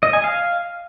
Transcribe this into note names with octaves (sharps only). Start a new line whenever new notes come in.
D#5
G#5
F5